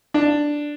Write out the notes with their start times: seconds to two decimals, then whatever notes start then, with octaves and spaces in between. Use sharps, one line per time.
0.14 D4